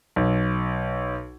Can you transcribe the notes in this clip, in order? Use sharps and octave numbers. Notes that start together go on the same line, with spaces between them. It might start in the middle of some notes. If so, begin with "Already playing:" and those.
B1